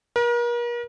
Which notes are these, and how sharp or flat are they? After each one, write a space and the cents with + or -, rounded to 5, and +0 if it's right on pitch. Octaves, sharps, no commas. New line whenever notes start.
A#4 +40